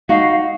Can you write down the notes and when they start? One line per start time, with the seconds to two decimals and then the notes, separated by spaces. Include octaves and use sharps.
0.09 D#4 F#4 F5